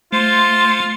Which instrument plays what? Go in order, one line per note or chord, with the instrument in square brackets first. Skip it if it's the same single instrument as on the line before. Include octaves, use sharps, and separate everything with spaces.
[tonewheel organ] A3 [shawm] F4 [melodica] C5 [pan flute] C6